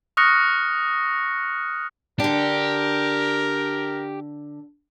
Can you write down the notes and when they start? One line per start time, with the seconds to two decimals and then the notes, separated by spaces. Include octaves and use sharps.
0.17 C#6 D#6 F6 F#6 A#6 C#7
2.20 D3 D4 G4 A#4